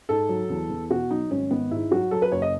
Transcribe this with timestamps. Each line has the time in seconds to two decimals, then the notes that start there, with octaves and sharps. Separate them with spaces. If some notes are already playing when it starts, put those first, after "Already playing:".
0.09 G#2 A4
0.29 F#3
0.50 E2
0.70 E2
0.90 B2 F#4
1.10 F#3 D#4
1.31 G#1 C#4
1.51 G#1 B3
1.71 G#2 E4
1.92 F#3 F#4
2.11 F#3 A4
2.22 B4
2.32 F#1 C#5
2.42 D#5